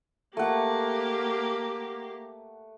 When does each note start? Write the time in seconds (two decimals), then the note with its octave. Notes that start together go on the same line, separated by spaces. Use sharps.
0.37 A3 A#3 G4 F#5